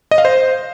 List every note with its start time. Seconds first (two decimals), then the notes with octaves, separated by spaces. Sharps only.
0.11 D#5
0.18 F5
0.25 C5